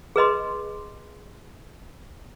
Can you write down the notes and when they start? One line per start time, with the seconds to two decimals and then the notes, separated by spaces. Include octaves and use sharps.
0.16 G#4 B4 D#5 C6